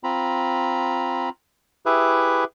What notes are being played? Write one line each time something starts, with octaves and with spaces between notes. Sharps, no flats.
C4 F4 A#5 B5
E4 G4 G#4 B4 E5